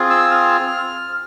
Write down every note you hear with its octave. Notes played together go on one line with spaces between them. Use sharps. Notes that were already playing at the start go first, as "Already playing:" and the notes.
Already playing: C4 F4 G#4
E6
F6